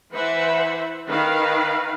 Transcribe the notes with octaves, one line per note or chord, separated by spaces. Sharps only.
E3 B4 C5 E5 F#5
D#3 B4 F5